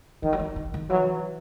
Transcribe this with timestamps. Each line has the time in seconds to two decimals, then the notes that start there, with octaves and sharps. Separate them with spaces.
0.23 D#3 E3
0.33 F#3
0.39 E3
0.56 D#3
0.74 D#3
0.90 E3 F#3